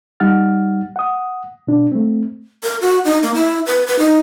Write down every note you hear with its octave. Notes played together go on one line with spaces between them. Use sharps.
G3 D#4 F#5 F6 A6
F#5 D#6
B2 D4
A3 C4
A#4
F#4
D#4
A#3
E4
B4
B4
D#4